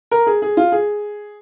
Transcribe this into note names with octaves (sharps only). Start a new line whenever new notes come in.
A#4
G#4
G#4
F4
G#4